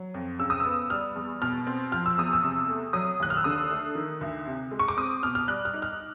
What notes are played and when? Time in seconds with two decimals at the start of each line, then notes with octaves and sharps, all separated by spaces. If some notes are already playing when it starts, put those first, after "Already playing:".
Already playing: F#3
0.14 F2
0.39 C#3 E6
0.50 D#6
0.60 E6
0.65 B3
0.90 G3 F6
1.16 E2
1.42 B2 F6
1.67 C4
1.92 F3 F6
2.06 E6
2.18 E2 D#6
2.33 E6
2.43 C3
2.69 A3
2.93 F#3 D#6
3.20 D#2 F#6
3.30 F6
3.37 E6
3.44 D3 D#6
3.70 A3
3.95 D#3
4.21 D2
4.47 C3
4.72 G#3
4.79 C#6
4.88 D6
4.97 C4 D#6
5.23 B2 F6
5.35 F6
5.48 G3 F#6
5.65 F6
5.74 D#4
5.82 F6